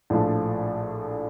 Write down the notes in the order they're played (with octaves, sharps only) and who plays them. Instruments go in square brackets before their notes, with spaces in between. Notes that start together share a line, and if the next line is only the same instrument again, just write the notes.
[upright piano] A#1 A2 F3 A3 D4